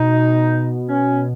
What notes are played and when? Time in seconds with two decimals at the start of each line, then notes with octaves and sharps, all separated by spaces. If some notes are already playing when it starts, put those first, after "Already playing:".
Already playing: B2 D#4
0.89 C#4